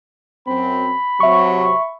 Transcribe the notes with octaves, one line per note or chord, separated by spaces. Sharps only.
F#2 C4 B5
C3 F#3 E5 C#6